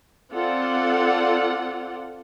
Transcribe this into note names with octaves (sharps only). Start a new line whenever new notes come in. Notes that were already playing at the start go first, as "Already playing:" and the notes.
C4 F4 A4 D5 F#5